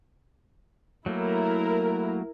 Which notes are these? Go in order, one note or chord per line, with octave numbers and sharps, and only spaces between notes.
F#3 A3 A#3 E4 A#4